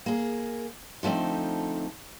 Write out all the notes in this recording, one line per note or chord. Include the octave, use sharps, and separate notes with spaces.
A#3 G#4
D3 F3 A3 C4 D#4